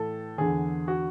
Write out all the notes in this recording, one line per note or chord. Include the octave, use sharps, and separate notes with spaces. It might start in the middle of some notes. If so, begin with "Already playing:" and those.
Already playing: A2 E3 A4
E2 D3 G#4
F#4